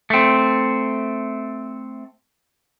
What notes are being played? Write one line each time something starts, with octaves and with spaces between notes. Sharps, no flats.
A3 C4